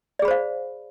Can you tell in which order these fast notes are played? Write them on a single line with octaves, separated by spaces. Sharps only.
D5 G#4 B5 C5 F5